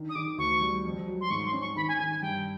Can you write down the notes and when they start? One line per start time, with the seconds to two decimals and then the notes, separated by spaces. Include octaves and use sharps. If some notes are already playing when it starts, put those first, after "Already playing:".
Already playing: D#3 D4
0.09 D#6
0.15 D#3 D6
0.38 D2 C#6
0.61 G3
0.85 F2
1.08 F#3
1.21 C6
1.30 G#2 C#6
1.46 C6
1.53 C#4
1.61 C#6
1.76 D#3 B5
1.88 G#5
1.99 D#3 G#5
2.10 G#5
2.22 G2 G5